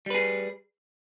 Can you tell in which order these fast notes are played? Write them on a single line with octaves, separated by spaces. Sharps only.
G3 B4 G#4